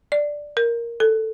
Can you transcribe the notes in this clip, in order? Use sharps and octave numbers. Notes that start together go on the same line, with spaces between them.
D5
A#4
A4